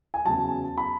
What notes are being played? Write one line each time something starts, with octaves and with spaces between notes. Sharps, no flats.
G#5
E2 C#3 F#3 A5
B5